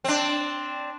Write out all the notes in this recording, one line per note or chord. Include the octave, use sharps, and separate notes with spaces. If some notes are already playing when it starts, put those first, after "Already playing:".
C4 D4